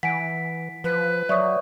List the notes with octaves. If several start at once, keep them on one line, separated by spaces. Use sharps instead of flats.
E3 F#5 G#5 B6 D7
F3 B4
F#3 C#5 D5 E5 C#6 D#6